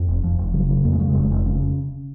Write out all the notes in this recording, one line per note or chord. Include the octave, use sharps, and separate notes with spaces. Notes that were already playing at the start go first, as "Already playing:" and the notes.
Already playing: F2
F1
F1 F3
F1
C#3 F#3
C#3
F2 A#3
G#3
C#3 F#3
G#3
F1
F1
C#3